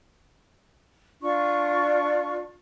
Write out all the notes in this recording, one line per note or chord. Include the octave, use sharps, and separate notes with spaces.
D4 F4 C#6